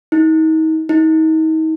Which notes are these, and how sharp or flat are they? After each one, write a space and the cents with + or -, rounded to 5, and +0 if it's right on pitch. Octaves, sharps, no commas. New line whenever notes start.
D#4 +35
D#4 +35